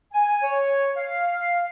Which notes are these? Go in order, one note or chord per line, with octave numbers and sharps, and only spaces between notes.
G#5
C#5
F5